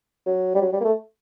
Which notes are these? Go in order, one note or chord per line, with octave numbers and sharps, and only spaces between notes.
F#3
G3
F#3
G3
A#3
A3